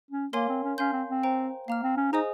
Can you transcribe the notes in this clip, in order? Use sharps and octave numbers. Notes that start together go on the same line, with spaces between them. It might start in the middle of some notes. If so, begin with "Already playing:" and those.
C#4
A#3 A#4 C#5 F5 G#5 C6
C4
C#4
C#4 F5 G#5 C6 G6
C4
C4
C5 G5 A#5
A#3 F5 A#5 F6
C4
C#4
D#4 G#4 C5 D#5 G#5 D#6